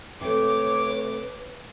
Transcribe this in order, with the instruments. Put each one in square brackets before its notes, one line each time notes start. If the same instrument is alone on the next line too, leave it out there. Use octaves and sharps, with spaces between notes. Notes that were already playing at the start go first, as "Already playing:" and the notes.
[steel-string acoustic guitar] C3 A3 [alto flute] B4 [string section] C#5 D6